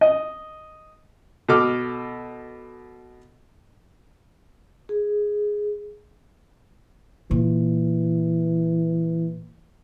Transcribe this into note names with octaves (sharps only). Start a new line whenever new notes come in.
D#5
B2 A4 D6 F6
G#4
A#2 E3